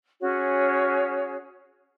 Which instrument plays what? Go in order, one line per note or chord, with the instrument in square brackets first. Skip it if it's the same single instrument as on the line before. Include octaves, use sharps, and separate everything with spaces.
[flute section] C#4 F#4 G#4 C#5